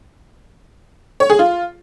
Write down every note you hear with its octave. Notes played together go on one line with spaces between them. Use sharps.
C#5
G#4
F4